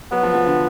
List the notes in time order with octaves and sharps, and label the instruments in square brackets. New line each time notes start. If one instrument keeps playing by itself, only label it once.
[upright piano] F#3 [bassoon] B3
[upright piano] F3
F3
D3